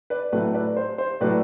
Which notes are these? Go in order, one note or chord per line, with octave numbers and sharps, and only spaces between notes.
B4 D5
A2 F#3 A3 B4
B4 D5
C5
C5
A2 F#3 A3 B4 D5